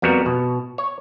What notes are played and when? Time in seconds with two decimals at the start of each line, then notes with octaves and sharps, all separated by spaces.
0.02 F2 G3 B3 F#4 A#4
0.26 B2
0.78 C#5